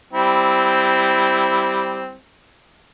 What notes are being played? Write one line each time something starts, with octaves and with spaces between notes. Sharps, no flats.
G3 C4 E4